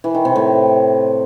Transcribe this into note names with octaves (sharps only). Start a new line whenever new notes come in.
E3
D#3
C3
A2